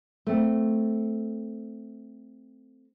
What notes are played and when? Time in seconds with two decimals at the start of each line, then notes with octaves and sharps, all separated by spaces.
0.27 A3 C4